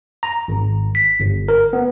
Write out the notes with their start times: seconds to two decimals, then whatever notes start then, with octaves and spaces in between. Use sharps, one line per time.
0.23 A#5
0.48 G#1
0.95 B6
1.20 G1
1.48 A#4
1.73 B3